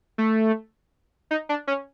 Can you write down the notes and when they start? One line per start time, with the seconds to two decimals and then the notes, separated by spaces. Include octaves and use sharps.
0.18 A3
1.31 D#4
1.49 D4
1.67 C#4